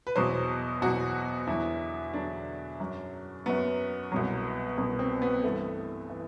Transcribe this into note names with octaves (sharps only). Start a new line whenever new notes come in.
B4
E2 B2 F#3 C5
E2 B2 F#3 F#4
E2 D3 F#3 E4
E2 D3 F#3 D4
F#2 F#3
F#2 F#3 B3
C2 B2 F#3
C2 B2 F#3
C4
B3
G2 E3 A3
E3